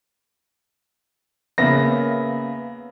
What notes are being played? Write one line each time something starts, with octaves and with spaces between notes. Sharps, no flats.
C#3 A#3 B3 E5 B5 A#6